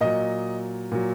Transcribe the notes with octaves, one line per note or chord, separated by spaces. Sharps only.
A#2 F#3 D#5
A#2 F#3